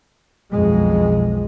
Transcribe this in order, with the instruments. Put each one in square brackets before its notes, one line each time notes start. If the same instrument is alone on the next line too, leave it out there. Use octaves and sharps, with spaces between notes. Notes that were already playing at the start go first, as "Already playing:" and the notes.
[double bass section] B1 F2 G#3